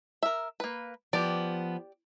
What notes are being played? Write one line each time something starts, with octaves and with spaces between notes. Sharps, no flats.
A#4 E5
A#3 B4
F3 B3 G4 D5